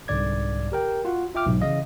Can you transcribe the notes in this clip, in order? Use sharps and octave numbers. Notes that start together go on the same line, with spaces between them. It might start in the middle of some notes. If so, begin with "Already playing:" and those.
C2 G#2 D3 D5 G#6
G4 A#4 G5
F4 F#4 F#5
F4 E5 G5 D6 F6
B1 G#2 B2
C#3 E3 D#5 F5